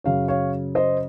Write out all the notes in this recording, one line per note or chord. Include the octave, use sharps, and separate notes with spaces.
F#2 C#3 F#3 C#5 F5
C#5 F5
C5 D#5